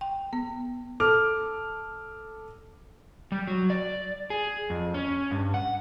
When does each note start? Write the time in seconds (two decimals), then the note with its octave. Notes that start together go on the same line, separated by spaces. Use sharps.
0.01 G5
0.33 B3
1.00 A4 D6 F6
3.32 G3
3.48 F#3
3.70 D5
4.30 G#4
4.70 F2
4.94 C#4
5.31 G2
5.54 F#5